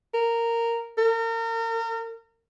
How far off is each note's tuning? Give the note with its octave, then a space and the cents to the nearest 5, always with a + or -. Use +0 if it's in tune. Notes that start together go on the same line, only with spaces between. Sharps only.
A#4 -10
A#4 -35